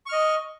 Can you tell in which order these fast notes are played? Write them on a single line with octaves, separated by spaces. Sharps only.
C#6 F6 D#5